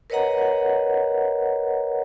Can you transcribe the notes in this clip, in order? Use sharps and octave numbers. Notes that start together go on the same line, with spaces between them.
A#4 B4 C#5 D#5 F#5 A#5